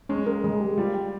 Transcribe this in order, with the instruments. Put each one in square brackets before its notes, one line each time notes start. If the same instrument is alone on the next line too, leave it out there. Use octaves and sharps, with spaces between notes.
[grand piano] G#3 [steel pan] C#4
[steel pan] A#4
G#3
G4
[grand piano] G3 [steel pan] F4
[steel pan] G5